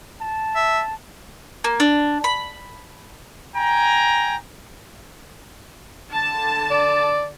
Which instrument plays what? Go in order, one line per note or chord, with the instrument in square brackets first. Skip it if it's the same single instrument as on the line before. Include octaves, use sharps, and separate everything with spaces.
[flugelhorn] A5
[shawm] E5
[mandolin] A#3
D4
B5
[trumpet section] G5 G#5 A#5
[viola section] D3 A5
[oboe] D5